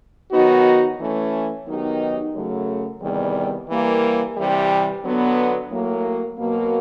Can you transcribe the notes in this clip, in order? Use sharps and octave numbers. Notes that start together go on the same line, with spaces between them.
D#3 F#3 B3 D#4 F#4
E3 A3 C#4
D#3 F#3 B3 D#4 G4
F#2 C#3 F#3 A3
E2 C3 D#3 G3
E3 G3 A#3
C3 E3 G3
D3 F#3 B3
A2 F#3 A#3
B2 F#3 A#3